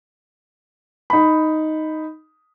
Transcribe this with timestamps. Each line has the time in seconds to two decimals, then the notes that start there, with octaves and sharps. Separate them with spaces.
1.10 D#4 B5